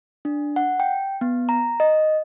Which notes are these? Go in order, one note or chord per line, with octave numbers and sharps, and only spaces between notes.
D4
F#5
G5
B3
A#5
D#5